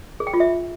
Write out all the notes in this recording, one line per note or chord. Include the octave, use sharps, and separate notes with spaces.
G#4
G5
F4
E5